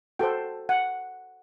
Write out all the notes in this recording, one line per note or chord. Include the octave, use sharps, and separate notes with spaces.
F#4 A4 C5 G5
F#5